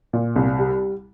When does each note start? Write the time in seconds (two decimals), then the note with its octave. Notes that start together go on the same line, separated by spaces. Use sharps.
0.13 A#2
0.36 C2
0.59 G3